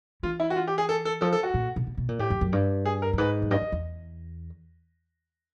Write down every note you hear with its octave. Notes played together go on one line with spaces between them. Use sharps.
E3 F4
E4
F#4
F4
G4
G#4
A4
A4
F3 A4
A4
F#4
A#2
B2
B2
B2
A#2
A2 G4
F2
F#2
G2
G#4
A#4
G2
G#2 B4
F#2
G2 D#5
F2
E2